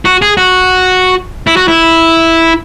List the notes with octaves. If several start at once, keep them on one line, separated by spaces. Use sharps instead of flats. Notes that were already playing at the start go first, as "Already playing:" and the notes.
F#4
G#4
F#4
E4
F#4
E4